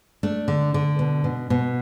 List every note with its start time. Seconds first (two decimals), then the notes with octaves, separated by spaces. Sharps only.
0.23 A3 D4
0.48 D3
0.74 D3
0.99 B2
1.24 B2
1.50 B2